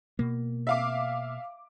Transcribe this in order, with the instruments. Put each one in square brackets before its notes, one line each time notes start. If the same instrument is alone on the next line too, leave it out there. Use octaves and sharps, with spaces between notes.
[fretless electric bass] B2 A#3
[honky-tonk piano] E5 F5 D6